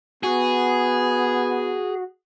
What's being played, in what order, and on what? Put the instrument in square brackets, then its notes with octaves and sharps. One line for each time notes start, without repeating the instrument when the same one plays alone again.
[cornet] B3 [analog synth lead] F#4 [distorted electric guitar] G#4